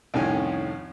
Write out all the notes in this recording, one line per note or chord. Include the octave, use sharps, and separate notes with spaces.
C2 F2 A2 D#3 C#4 G#5